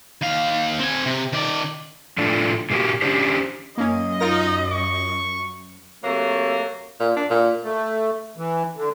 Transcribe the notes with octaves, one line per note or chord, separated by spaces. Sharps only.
D#2 F5
C4 G#5
C3
D#3 D5
A2 F3 A3 D4
A#2 G#3 A#3 F#4 G4
C#4 D4 G4 C5
F#2 A#3 C#4 D#5
D#4 F4 A#4 A#6
C#6
C3 F#3 A3 A#3
A#2
D4
A#2
A3
E3
D3